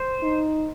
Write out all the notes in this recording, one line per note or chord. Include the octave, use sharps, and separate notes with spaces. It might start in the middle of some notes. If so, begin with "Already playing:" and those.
Already playing: C5
D#4